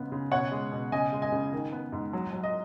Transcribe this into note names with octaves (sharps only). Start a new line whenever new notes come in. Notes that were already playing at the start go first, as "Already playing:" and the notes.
Already playing: G#2 C#3 B3
C#3
B2 C#5 F#5
G#3
B2
C#3 D#5 G#5
G#3
D#5 G#5
C#3
D#3
B3
G#2
F#3
F#3
D#5